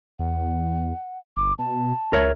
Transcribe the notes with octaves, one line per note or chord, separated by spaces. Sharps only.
E2 F#5
G1 D6
B2 A5
C#2 A#4 C#5 E5